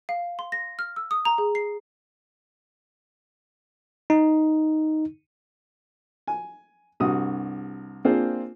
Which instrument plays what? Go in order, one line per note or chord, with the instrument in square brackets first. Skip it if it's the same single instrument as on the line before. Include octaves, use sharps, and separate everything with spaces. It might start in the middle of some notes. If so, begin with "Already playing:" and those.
[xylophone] F5
C6
A#6
F6
E6
D#6
A#5
G#4
C7
[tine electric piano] D#4
[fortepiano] G#5
C2 G2 F#4 D#6
A#3 C4 D4 F4 G#4 C5